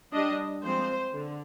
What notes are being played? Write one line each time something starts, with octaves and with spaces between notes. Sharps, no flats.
G3 D4 D#5
F3 G#3 C4 C5
D3